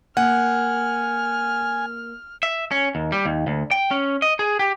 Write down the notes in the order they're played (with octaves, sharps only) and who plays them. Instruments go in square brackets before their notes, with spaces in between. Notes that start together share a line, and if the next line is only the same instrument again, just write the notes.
[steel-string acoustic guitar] A#3 [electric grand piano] F#5 [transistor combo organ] G#5 [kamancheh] F6
[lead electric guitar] E5
C#4
D#2
G3
D#2
D2
G5
C#4
D#5
G#4
G4